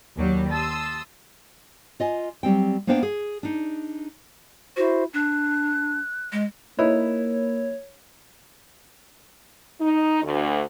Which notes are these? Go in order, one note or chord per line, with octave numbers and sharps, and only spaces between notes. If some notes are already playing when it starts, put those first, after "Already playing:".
D#2 F#3 G3
A5 C6 D#6 E6
F4 D#5 G#5
F#3 G3 C4 G5
A#3 B3 D4 C5 F5 G5
G#4
D4 D#4
E4 F#4 C5
D4 F#6
G#3
A#3 D#4 E4 B4 C#5
D#4
D2